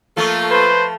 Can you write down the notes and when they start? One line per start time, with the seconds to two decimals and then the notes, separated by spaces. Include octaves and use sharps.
0.17 F3 A3 A#3 F4 A4
0.51 B4 C5